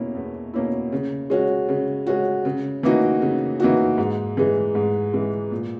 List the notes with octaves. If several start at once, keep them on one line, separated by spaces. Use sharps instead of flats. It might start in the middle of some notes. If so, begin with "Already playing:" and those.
Already playing: E2 B2 A#3 C#4 E4
E2
B2 A#3 C#4 E4
C#3
G#3 C#4 F#4
C#3
G#3 C#4 F#4
C#3
E3 A#3 D#4 F#4
C#3
E3 A#3 D#4 F#4
G#2
E3 G#3
G#2
E3 G#3
A#2